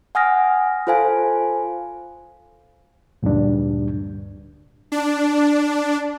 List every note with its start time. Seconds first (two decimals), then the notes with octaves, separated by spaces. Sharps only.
0.15 F#5 G#5 D#6 F6 A#6
0.87 F4 A4 C5 F5 G#5
3.23 D2 G2 A#2 G3 D4
4.92 D4